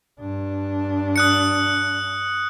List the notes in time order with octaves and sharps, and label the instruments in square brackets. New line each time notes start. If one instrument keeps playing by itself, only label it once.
[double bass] G2 D4
[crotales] D#6 F#6 C#7